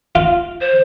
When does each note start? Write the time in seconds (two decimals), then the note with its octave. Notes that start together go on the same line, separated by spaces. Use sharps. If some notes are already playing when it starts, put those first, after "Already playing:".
0.15 F4
0.61 C5